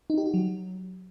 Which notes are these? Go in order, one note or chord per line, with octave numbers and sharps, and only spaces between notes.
D#4
G4
F#4
F#3